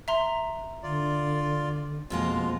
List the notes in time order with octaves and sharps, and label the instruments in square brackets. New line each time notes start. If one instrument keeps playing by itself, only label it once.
[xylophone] E5 A#5 C6
[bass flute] D3 [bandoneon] F4 D5
[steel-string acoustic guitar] F2 B2 A#3 [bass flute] F3 [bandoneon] G#3 F4